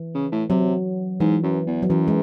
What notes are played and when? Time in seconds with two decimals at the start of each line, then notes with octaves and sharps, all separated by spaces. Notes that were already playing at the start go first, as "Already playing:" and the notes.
Already playing: E3
0.15 C#3
0.32 A2
0.50 C3 F#3
1.20 G#2 E3
1.43 F#2
1.67 E2
1.83 F#3
1.90 F#2 E3
2.08 G#3